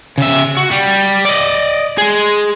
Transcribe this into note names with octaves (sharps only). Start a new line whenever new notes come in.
C#3 E5
F#4
G3
D5 D#5
G#3 G#4